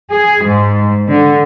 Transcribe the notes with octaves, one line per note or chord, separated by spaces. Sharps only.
G#4
G#2
D3